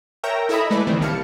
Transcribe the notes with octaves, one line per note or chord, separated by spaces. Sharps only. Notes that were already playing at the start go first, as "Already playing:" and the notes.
A#4 C#5 E5 G5 A#5
E4 A4 D#5 E5 A#5 B5
G#3 A3 E4 B4 D5
D#3 E3 C4
C2 A#2 G3 F5 A5 C#7